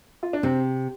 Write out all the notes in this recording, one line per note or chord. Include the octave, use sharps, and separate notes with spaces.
F4
D4
C3 C4